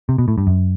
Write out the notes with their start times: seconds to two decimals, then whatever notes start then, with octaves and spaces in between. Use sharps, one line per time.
0.09 C3
0.18 B2
0.28 A2
0.38 G2
0.47 F#2